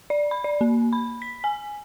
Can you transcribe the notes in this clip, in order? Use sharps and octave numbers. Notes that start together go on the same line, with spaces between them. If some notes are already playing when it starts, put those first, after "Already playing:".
D5
B5
D5
A#3
B5
B6
G#5